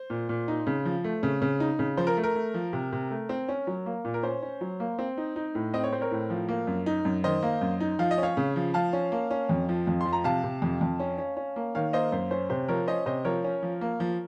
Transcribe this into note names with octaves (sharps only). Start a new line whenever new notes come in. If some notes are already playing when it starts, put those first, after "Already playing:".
Already playing: C5
A#2
A#2
D#4
C#3
F3
A3
C#3
C#3
D#4
C#3
F3 C5
A#4
A3
A#4
A3
F3
C3
C3
A3
C4
C#4
F#3
A#3
A#2
A#4
C#4 C5
C#4
F#3
A#3
C4
D#4
D#4
A2
C4 D#5
C#5
C4 C5
A#4 C#5
A2
F3
A#3
F#2
D#4
F#2
D#3 C5 D#5
A#3
F#2
D#4
F3 F5
D#5
C#4
C#5 F5
C#3
F3
F3 F5 A5
C#4
A#3
C#4
F2
F3
F2
F3 C6
A#5
C3 F5 A5
C3
F2
F2
C#4
C#4
C#4
A#3
D#3 C#5 F5
A#3 C5 D#5
F#2 C5
C#4 C5
C3 C5
F3 A#4 C#5
C#4 C5 D#5
C3 C5 D#5
F3 A#4 C#5
C#4
F3
A#3
F3